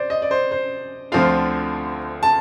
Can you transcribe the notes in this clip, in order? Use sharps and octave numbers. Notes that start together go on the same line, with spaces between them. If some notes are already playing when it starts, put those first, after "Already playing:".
Already playing: C5 D5
D#5
D5
C5
C5
D2 D3 F3 C4 F4 F5
A5